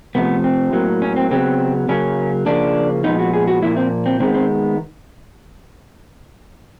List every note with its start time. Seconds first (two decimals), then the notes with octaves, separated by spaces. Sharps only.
0.15 C3 F3 A3 B3
0.44 C4
0.73 A2 F#3 A#3
1.02 C#4
1.16 C4
1.31 C#3 F#3 B3 C4
1.89 C#3 F#3 A#3 C#4
2.46 C#3 F3 A#3 D4
3.04 A#2 F3 G#3 B3 D#4
3.19 F#4
3.33 G#4
3.48 F#4
3.62 A#2 F3 A#3 E4
3.77 C4
4.06 C4
4.20 D#3 G#3 B3 C4
4.35 C4